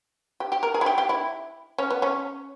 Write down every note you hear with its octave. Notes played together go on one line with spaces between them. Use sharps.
G4
G4
A#4
G#4
E4
G4
G4
E4
C#4
B3
C#4